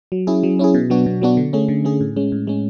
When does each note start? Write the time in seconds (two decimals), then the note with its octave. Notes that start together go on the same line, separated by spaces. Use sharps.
0.12 F#3
0.27 C#4 E4 G#4
0.43 F#3
0.59 C#4 E4 G#4
0.74 B2
0.90 F#3 B3 D4 F#4
1.06 B2
1.22 F#3 B3 D4 F#4
1.37 D3
1.53 A3 C#4 G#4
1.68 D3
1.85 A3 C#4 G#4
2.01 A2
2.16 G#3 C#4
2.32 A2
2.47 G#3 C#4